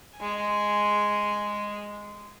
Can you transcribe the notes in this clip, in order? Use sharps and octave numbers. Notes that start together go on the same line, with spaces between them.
G#3 G#5